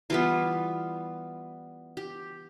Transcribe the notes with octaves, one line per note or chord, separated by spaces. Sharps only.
E3 G3 B3 F4
G4